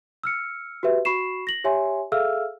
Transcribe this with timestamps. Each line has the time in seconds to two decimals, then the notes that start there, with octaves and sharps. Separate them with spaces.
0.24 E6 F6 C#7
0.83 F#4 G4 B4 E5
1.05 F#4 B5 C#6 C7 E7
1.47 A#6 F#7
1.64 G4 C#5 E5 G#5 C6
2.12 G#4 A4 E5 F5 E6 F6